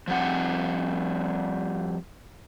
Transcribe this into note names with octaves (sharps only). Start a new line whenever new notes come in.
F3 G3 C4 F#5